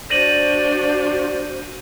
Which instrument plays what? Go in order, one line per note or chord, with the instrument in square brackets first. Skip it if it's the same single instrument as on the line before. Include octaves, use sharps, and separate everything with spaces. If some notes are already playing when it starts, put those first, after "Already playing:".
[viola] D4 F#4 [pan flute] C5 [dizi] D5 [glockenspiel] A#6 D#7 F#7